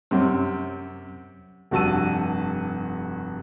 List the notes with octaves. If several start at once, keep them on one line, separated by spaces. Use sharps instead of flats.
F#2 C3
F1 G2 F#4 A5 E6 D#7